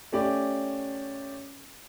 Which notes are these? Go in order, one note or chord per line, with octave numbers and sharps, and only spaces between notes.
A3 C#4 G4 D5